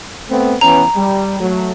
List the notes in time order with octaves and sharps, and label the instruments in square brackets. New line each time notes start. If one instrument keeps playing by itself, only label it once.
[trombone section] A3 B3 C4
[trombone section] E3 B3 C#4 [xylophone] A#5
[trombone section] G3
F#3 A3